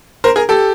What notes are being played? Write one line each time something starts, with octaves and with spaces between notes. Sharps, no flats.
A#4 C5
G#4 A#4
G4 A4